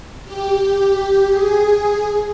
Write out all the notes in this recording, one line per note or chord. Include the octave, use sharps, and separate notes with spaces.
G4
G#4